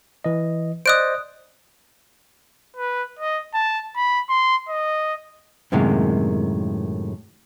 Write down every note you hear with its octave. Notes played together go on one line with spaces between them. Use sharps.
E3 D#5
C5 D5 D#5 D#6 F#6 D7
B4
D#5
A5
B5
C6
D#5
F#2 A2 C3 D#3 G#3 A#3